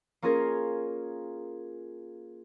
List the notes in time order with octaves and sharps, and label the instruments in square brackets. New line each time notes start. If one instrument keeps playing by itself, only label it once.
[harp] A#3 C#4 F4 G#4 A#4